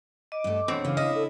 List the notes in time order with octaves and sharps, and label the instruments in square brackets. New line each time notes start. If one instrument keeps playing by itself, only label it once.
[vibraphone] D#5 [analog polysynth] D6
[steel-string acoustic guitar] G2 A3
[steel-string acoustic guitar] E2 [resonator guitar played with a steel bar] B2 C4 [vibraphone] D4 C#5
[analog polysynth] C#3 F5 [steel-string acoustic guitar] E3
[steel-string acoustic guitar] E4 [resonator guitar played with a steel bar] D#5
[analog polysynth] A4